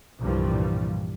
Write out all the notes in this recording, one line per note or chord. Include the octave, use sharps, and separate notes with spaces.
C2 G2 A#2 E3 F3 G3